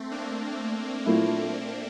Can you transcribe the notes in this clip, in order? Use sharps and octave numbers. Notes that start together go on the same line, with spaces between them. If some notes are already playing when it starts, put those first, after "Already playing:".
Already playing: A3 C4
A#3 D4
A#2 A3 E4